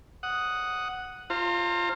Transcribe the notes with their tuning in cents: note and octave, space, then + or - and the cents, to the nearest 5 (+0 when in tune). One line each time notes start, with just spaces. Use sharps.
F#5 +0 D#6 +0
F4 -10 C5 +20 A#5 -35